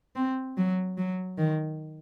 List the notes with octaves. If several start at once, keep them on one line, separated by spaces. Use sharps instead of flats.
C4
F#3
F#3
D#3